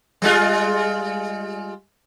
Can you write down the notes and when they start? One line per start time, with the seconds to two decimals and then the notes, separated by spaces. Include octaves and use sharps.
0.22 G3 G#3 F4